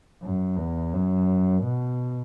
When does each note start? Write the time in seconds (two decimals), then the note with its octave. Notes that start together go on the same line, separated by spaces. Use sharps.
0.22 F#2
0.57 E2
0.93 F#2
1.63 B2